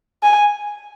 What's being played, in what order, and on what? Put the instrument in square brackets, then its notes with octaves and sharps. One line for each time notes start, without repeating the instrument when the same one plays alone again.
[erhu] G#5